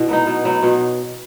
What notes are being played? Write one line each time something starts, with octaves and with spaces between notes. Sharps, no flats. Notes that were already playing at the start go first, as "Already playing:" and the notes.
Already playing: B2 E4
F#3 B3 D#4
B2
F#3 B3 D#4
B2 F#4